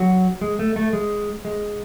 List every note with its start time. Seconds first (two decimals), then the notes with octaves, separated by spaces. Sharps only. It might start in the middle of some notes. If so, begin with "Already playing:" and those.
Already playing: F#3 F#4
0.41 G#3
0.59 A3
0.76 A3
0.93 G#3
1.45 G#3